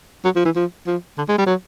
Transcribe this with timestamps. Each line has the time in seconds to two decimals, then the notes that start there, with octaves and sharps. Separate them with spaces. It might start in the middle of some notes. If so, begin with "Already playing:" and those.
0.25 F#3
0.36 F3
0.45 E3
0.56 F3
0.87 F3
1.18 D3
1.28 G#3
1.38 G3
1.46 F#3